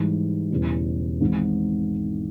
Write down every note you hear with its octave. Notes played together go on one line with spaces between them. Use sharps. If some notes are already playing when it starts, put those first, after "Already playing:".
Already playing: G#2 E3 G3
E1 E2 C#3 G3
G#1 G#2 E3